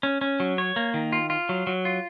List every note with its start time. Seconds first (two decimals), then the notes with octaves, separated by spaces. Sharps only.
0.03 C#4
0.21 C#4
0.40 F#3
0.58 C#5
0.76 A#3
0.94 D#3
1.12 F4
1.30 F4
1.49 F#3
1.67 F#3
1.85 F4